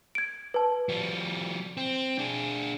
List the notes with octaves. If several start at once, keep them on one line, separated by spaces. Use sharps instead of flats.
G#6 D7
B4 A5
F3 G3
C4
D4 G#4